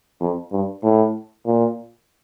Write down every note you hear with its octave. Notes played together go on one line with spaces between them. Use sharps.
F2
G2
A2
A#2